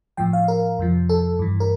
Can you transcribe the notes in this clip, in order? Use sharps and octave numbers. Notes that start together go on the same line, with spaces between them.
A2 F3 G5
F5
A#4
F2 C3 F3
A4
G2 E3
A#4